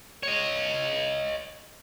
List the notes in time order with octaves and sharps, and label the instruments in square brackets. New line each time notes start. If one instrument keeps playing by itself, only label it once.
[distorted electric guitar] C#5 D#5